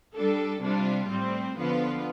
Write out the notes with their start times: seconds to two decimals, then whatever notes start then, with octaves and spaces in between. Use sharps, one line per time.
0.16 G3 D4 A4
0.63 C3 G3 D4 F4
1.09 A2 G3 C4
1.57 D3 F3 B3 F4 B4